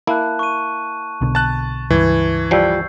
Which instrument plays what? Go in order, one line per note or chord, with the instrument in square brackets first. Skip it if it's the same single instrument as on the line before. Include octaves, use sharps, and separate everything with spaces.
[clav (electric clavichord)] A#3 E4 [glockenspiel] A5 F#6
[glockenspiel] C#6 D#7
[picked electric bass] B1 B2 D3
[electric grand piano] A5 F#6 [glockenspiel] A6
[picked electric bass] C#2 G2 [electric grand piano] E3 [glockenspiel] C#6 G#6
[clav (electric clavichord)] F3 G3 [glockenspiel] E6 G6 C7